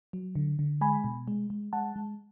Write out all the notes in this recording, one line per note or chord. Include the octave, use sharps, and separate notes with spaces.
F#3
D3
D3
G#3 G#5 B5
B2
G#3
G#3
G#3 F#5 A5
G#3